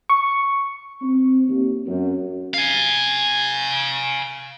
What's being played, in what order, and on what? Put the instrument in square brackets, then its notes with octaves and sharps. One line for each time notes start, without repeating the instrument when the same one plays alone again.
[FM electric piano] C#6
[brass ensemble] C4
D#2
F#2
[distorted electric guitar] F5 G#5